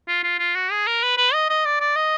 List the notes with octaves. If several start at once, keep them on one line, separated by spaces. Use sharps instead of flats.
F4
F4
F4
F#4
G#4
A#4
B4
B4
D#5
D#5
D5
D5
D#5